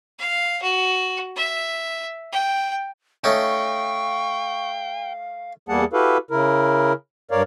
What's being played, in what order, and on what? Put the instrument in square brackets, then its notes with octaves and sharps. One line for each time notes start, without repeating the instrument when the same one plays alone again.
[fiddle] F5
F#4
E5
G5
[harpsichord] A3 C#4 D#4 [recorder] F5 [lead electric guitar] G5 [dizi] C#6
[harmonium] E2 G3 A#3 G#4 F#5 A5
E4 F#4 G4 A4 B4 F5
C#3 E4 A#4
G2 A#4 C#5 D5 F5